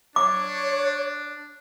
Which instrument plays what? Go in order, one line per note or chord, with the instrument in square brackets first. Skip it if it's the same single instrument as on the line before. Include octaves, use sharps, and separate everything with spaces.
[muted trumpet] D4 [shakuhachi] C#5 [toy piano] D6